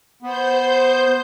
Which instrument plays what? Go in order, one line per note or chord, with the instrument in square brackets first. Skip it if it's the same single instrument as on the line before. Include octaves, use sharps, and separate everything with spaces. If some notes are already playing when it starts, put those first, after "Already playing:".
[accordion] B3 [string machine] C5 G6